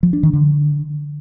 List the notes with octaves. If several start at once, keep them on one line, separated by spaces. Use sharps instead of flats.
F3
D4
D#3
D3